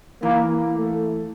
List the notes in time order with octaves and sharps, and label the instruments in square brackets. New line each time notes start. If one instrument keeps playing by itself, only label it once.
[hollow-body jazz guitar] E3 [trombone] A#3
[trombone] A3